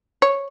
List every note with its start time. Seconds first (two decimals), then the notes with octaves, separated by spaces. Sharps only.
0.22 C#5